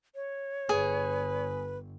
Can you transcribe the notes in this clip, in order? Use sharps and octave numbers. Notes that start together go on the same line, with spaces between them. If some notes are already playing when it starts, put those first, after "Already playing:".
C#5
G1 G#4 B4